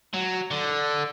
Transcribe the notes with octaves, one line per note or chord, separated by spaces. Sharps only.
F#3
D3